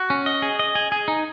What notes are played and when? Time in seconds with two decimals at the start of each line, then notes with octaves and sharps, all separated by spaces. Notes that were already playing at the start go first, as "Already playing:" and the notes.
Already playing: F#4
0.10 C#4
0.26 D#5
0.42 G#4
0.59 D#5
0.75 G#4
0.92 G#4
1.08 D#4